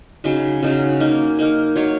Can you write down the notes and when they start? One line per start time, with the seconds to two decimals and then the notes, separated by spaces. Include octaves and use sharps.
0.24 C#3 F#3 D#4 F#4
0.63 C#3 F#3 D#4 F#4
1.00 A#3 D#4 A#4
1.39 A#3 D#4 A#4
1.76 F#3 D#4 A#4 C#5